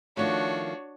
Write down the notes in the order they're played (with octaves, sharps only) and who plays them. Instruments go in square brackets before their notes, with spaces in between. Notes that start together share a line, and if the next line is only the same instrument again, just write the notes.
[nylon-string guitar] D#3 F3 A3 [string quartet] D4 F#4 C#5